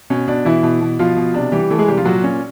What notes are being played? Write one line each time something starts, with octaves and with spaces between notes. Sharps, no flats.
B2 C#4
B2 D4
B2 E3 E4
B2
B2
B2 F3 F4
B2
C3 D4
E3 G3 G4
E3 A3 A4
G#3 G#4
C3 G3 G4
F3 F4
A#2 F#3 F#4
A#2 C#4